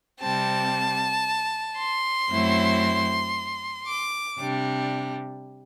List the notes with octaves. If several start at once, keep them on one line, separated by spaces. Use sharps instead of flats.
C3 G3 C4 A5
C6
F#2 F#3 A3 C4 E4
D6
C3 G3 D4